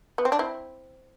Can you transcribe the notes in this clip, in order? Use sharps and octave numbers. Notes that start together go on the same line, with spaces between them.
B3
C4
D4
C4 E4